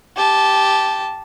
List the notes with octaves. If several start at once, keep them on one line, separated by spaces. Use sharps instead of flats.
G4 A5